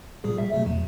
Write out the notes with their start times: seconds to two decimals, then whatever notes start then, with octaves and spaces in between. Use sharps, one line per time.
0.24 A#2 G3 G#4
0.38 E5
0.53 B2 F#3 A3
0.66 E2